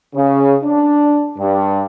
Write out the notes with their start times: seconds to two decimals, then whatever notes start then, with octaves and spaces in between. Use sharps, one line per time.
0.14 C#3
0.63 D4
1.38 G2